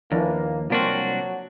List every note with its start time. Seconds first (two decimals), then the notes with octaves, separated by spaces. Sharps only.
0.12 D#2 E3 F3 A#3 D4
0.70 C2 F#3 A#3 C4 D4 F4 F#4